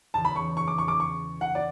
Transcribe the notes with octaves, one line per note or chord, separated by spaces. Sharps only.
E2 C#3 E3 A5
B5
C#6
C#6
D6
C#6
D6
C#6
F#5
D5